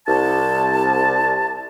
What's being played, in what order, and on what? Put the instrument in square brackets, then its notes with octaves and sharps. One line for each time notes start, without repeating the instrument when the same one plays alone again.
[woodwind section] C2 A5